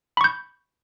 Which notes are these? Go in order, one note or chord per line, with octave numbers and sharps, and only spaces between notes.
B5 C#6 G6